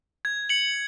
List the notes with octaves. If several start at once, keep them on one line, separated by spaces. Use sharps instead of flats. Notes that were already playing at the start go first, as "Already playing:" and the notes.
G#6
C#7 F#7